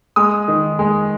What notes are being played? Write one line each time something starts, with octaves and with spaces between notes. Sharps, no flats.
G#3 D#6
D#3
G#3